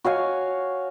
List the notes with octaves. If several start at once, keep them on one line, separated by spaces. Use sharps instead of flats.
F#4 C#5 F5 G#5